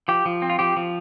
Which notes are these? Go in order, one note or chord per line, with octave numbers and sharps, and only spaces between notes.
F3 G4
F3
C4
F4
F3 G4
F3